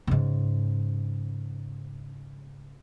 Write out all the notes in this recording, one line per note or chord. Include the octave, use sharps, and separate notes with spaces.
G#2 C#3